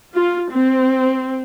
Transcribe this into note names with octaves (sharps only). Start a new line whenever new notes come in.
F4
C4